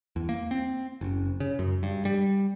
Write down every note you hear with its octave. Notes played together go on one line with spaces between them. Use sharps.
E2
A#3
C4
F#1
C#3
F#2
G2
G3